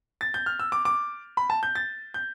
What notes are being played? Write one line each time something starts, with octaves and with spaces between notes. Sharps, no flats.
A6
G6
F6
E6
D6
D6
B5
A5
G6
A6
G6